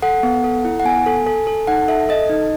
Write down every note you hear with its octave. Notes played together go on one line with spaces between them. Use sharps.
A4 F#5
B3
A4
E4
F#5
B3 G#5
A4
A4
A4
D#4 F#5
A4 E5
A4 D#5
D#4